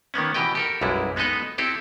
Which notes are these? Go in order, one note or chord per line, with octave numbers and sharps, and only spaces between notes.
D#3 A#3 B3 C#4
B2 E3 G4 D#5 G5
G4 A4 A#4
B1 F#2 G3 G#3 E4
G#3 B3 D#4 A4 B4 D#5
C4 E4 G4 A4 C5